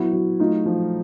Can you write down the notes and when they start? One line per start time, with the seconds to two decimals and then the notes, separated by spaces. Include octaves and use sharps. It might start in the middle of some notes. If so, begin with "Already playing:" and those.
Already playing: F#3 B3 E4 F#4
0.13 F#3
0.40 A3 D#4 F4
0.66 F3